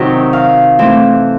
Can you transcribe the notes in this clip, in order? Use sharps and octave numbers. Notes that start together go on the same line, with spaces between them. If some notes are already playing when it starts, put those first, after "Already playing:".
Already playing: C3 D#3 F#3 D#5
F5
E3 A3 C4